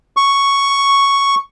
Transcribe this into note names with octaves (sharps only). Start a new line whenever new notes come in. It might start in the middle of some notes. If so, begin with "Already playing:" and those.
C#6